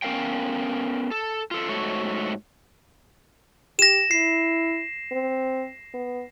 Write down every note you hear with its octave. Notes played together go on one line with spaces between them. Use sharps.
B3 C#4 A#4 F5 G5
A4
F4 A4
G#2 A3 F#4 A4 C#5
G4 A#6 E7
E4 C7
C4
B3